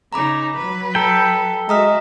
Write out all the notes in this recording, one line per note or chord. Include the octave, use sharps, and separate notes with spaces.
C#3 D#4 A#5 B5 D6
F#3 B4
A4 G5 A#5
G#3 F#4 E5 A#5 D#6 F6